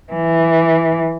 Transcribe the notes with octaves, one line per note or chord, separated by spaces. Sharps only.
E3